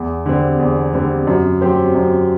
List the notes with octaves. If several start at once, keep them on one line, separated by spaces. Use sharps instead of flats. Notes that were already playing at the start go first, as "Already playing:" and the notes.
Already playing: E2
D3 G3 C4
E2
D3 G3 C4
F#2
F#3 C4 G4 C5
F#2